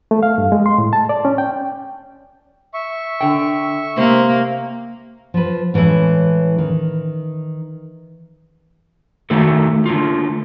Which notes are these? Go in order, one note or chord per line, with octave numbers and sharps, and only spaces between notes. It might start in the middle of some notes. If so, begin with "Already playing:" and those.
A3
F5
G2
G#3
C6
A2
A5
D5
C#4
G5
E5 C#6
D3 G5
C3 A#3 G4 C5
F3 B4
A2 E3 G#3 C#4 E4
D#3
D#3 A3 D#4 F#4 A4
D3 A3 F4